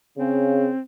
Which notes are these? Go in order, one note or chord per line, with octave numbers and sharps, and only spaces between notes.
C#3 C4